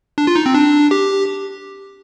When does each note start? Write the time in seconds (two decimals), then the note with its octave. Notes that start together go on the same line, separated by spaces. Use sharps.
0.18 D4
0.27 F4
0.36 D#4
0.46 C4
0.54 D4
0.91 G4